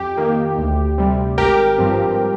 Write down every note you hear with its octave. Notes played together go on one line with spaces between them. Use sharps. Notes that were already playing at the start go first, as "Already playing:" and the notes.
Already playing: F2 G4
D#3 A#3
D2
C3 G3
G#1 G4 A#4
G2 F3 C4